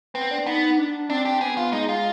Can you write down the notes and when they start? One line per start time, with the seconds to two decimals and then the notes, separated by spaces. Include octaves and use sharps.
0.15 B3 C4
0.31 D4
0.46 B3 D#4
0.62 D#4
0.78 D4
1.10 C4 D4
1.25 G4
1.41 B3 G#4
1.57 F4
1.73 G#3 D#4
1.89 F4